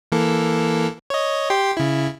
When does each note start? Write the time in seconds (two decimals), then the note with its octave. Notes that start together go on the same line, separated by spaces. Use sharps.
0.12 E3 A#3 A4
1.10 C#5 D#5
1.50 G4 G5 C6
1.77 C#3 E4